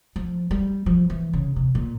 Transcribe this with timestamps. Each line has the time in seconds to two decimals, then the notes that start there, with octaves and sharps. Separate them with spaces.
0.16 F3
0.51 G3
0.86 F3
1.10 E3
1.33 C#3
1.56 C3
1.75 A#2